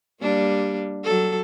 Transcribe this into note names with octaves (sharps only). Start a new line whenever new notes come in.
G3 A#3 D4
F#3 A4